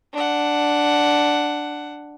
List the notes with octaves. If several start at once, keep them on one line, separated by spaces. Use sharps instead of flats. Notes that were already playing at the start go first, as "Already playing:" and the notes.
D4 F#5